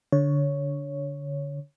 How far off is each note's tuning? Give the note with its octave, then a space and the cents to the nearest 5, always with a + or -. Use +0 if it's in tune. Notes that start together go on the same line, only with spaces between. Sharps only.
D3 -15 C#5 +5